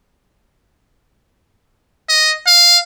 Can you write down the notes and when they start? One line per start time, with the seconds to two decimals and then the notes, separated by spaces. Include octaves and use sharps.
2.09 D#5
2.47 F5